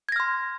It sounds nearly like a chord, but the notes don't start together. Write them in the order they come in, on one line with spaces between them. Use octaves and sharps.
G#6 A#6 F6 C6